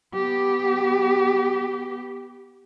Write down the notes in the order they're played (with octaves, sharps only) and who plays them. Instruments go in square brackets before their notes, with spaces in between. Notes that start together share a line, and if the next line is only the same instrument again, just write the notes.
[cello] B3 G4